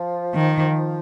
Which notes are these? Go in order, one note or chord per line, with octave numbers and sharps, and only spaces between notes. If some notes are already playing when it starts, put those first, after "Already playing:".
Already playing: F3
D#3